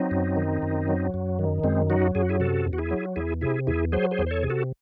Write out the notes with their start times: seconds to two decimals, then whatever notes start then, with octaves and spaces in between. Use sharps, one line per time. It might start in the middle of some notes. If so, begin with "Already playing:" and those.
Already playing: F#3 C4 D#4
0.11 F#2
0.37 D#3
0.62 F#2
0.88 F#3
1.14 F#2
1.39 D#3
1.64 F#2 G#3 C4
1.90 F#3 D#4 F#4
2.15 F#2 G#4
2.23 F#4
2.29 E4 G#4
2.40 C3 F#4 A4
2.65 E2
2.73 F#4
2.78 E4 G#4
2.91 F#3
3.16 E2 E4 G#4
3.41 C3 E4 G#4
3.67 E2 E4 G#4
3.92 F#3 G#4 C5
4.11 G#4 C5
4.19 E2
4.26 C5
4.31 A4 C#5
4.43 C3 G#4
4.50 F#4 A4